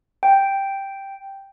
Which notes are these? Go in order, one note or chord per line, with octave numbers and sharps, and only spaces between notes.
G5